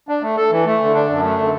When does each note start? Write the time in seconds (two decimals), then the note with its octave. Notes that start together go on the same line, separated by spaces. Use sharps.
0.09 D4
0.22 A3
0.37 A4
0.51 E3
0.66 A3
0.81 D3
0.94 D4
1.09 F#2
1.23 A3
1.39 D3